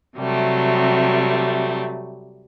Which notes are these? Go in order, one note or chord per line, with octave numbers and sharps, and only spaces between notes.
C3 F#3 G3 A3